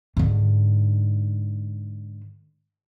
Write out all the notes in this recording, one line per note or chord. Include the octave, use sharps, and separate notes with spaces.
G#2 D3